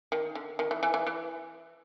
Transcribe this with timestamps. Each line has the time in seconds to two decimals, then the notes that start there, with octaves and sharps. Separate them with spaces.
0.12 D#3
0.35 D3
0.59 D#3
0.71 E3
0.83 E3
0.94 E3
1.07 E3